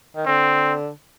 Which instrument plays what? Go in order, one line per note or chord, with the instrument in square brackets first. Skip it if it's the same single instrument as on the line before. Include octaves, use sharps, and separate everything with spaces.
[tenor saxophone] D#3
[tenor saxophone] D3 [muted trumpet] C4